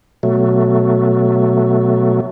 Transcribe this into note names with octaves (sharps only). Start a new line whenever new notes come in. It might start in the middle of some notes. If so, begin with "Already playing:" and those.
B2 F#3 A3